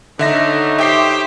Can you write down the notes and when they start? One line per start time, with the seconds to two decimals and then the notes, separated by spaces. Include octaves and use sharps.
0.19 D3 D#4 C#5 E5 A#6
0.79 G4 C5 E5 G5 C7